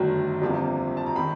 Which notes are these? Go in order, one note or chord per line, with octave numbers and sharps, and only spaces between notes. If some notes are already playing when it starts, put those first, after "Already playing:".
Already playing: G1 F#2 D#3 F#3 A3
G1 F2 C3 F3 A#3
A5
A#5
D#3 B5